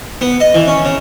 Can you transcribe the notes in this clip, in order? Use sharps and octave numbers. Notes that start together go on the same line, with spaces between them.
B3
D#5
E3
C#4
C#3